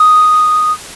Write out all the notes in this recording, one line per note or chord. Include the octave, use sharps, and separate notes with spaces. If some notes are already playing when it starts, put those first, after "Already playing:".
Already playing: D#6